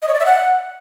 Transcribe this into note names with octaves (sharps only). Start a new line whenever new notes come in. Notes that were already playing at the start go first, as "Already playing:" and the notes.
D#5
C#5
D5
E5
F#5